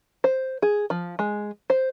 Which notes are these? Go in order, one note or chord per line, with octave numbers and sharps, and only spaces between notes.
C5
G#4
F3
G#3
C5